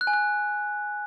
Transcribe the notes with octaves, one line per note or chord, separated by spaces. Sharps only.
F#6
G#5
F#6